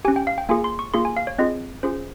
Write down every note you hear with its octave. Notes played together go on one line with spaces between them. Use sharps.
C#4 G4 G#5
G5
F5
G5
A#3 F4 G#4 G#5
C6
C#6
A#3 F4 G#4 C6
G#5
F5
C#5
C4 F4 G#4 D#5
C#4 F4 G#4 C5